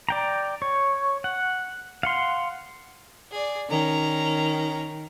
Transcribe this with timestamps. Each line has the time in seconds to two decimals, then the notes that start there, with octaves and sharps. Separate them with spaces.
0.09 D5 G5 A#5
0.62 C#5
1.24 F#5
2.03 F5 F#5 C6
3.31 G#4 D5
3.69 D#3 C#4 A#5